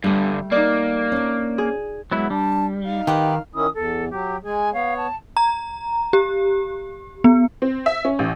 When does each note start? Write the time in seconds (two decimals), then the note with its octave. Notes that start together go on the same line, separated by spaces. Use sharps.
0.04 G2 D3 G3 A3
0.52 A#3 D#4 D5
1.12 C#4 D4
1.58 G#4
2.11 F#3 G#3 B3 E4
2.30 G3 D4 A5
2.84 D#4 F5
3.07 D#3 G4 B4 F#5
3.54 D#3 C#4 E4 D#6
3.75 E2 A4
4.11 F#3 G4
4.44 G#3 G#4 G#5
4.73 B3 C#5 F5
4.97 A5
5.37 A#5
6.13 G4
7.24 B3
7.62 C4
7.86 E5
8.05 C#4
8.19 A1